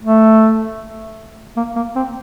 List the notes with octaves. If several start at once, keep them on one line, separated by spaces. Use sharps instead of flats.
A3
A#3
A#3
C4